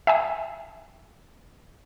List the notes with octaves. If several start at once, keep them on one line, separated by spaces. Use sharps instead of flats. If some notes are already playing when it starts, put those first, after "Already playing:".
E5 G5 G#5 D#6